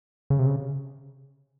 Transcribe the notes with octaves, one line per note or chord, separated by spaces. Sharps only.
C#3
C3
C#3